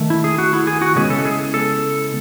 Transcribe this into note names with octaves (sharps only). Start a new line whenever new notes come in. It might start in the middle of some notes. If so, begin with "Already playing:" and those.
Already playing: D#3 A3
E4
G#4
F#4
E4
G#4
F#4
C#3 G#3 B3 E4 G#4
A4
G#4
A4